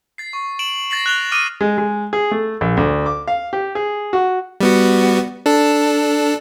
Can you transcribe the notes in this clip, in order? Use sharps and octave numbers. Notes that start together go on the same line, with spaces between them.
A6 C7
C#6
D7 E7 F#7
A6 A#6 C7 F#7
F#6 F7 G7
D6 D#6 F6 D7 D#7
G#3
G#3
G#4
A3
A#1
D2
D6
F5
G4
G#4
F#4
G3 B3 F#4
D4 A4